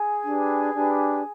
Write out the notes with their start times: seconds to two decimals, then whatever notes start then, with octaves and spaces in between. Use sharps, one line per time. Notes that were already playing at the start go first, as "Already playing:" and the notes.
Already playing: G#4 G#5
0.25 D4 G4 B4
0.74 D4 G4 B4